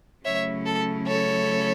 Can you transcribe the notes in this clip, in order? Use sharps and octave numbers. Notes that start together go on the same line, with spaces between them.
C#3 F#3 A3 C#4 E4 C#5 E5
A4
A4 C#5